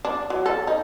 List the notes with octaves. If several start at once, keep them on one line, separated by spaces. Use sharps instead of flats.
D4
F#3
A4
D#4